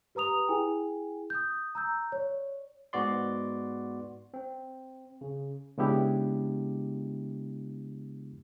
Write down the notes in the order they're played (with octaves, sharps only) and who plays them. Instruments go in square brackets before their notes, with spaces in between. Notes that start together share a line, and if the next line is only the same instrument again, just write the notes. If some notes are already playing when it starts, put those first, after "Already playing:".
[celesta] G4 B4 A#5 D#6 F7
E4 G#4 G5 G#5
D#6 G6
A#5 E6 G6
C#5 D5
[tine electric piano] G#2 B3 F#4 D5 C6
C4
C#3
[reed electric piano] C#3 G#3 B3 D4 E4 G4